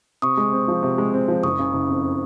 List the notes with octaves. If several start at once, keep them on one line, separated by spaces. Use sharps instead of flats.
C3 C#6 D#6
G#3
C4
F3
C3
G#3
C4
F3
F#1 C#6 D#6
C#3
F#1
F2